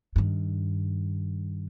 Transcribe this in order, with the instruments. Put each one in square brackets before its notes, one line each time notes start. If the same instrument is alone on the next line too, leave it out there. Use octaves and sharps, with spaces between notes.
[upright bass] G2 D#3